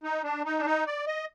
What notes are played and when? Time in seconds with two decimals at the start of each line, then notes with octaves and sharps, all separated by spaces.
0.03 D#4
0.24 D4
0.45 D#4
0.59 D4
0.66 D#4
0.87 D5
1.07 D#5